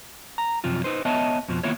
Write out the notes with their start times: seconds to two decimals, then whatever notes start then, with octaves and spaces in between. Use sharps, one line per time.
0.38 A#5
0.64 F#2 C3 F3 F4
0.84 D#4 B4 C5
1.05 B3 C#5 D#5 E5 A5
1.48 F2 B2 F3
1.63 D#3 A#3 B3 E4 F4 C#5